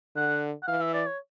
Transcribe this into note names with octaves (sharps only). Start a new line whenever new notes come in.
D3 F#5
F#5
E3 F5
E5
D5
C#5